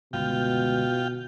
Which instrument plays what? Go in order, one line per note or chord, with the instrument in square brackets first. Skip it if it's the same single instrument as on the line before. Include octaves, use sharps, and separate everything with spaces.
[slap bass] G1 C#2 [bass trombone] B2 [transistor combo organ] F4 G5